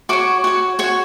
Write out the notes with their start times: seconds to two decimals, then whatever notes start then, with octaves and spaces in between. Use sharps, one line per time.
0.09 F#4 C#5 D6
0.44 F#4 C#5
0.79 F#4 C#5 C#6